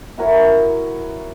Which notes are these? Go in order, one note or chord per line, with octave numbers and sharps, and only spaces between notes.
E4 F#4 A#4 C#5